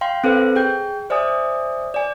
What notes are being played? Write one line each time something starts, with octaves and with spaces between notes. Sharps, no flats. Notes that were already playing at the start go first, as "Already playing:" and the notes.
F5 G5 C6
C4 A4 B4 C5
G#4 G5 G6
C5 D5 E5 G#5 D#6
D5 G#5